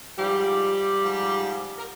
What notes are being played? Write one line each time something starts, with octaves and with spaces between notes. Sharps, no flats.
G#2 F3 G3 G4
G#2 F3
A#4